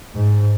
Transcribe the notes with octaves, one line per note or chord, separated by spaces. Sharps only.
G#2